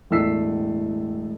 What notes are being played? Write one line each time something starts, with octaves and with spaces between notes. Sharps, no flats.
E1 A2 A3 E6 B6 C7